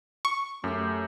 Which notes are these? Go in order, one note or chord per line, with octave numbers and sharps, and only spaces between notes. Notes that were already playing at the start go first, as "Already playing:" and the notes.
C#6
F#2 A3 G4 G5